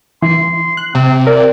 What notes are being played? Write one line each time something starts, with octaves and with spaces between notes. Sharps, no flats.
E3 C6
F#6
C3 C4
A#4 D5